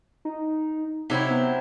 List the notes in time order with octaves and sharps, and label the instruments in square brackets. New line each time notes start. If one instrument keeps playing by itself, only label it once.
[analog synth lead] D#4
[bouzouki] C3 F#3 C4 E4 [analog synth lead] D#4
[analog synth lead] B3